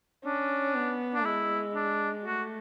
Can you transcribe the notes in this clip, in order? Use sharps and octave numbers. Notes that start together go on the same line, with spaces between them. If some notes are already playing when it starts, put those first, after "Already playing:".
C#4 D4
B3
D4
G#3 E4
D4
A3 F#4